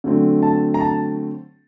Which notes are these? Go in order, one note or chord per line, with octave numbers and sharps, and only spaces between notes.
D3 F#3 A3 C4
A5
A#5
A5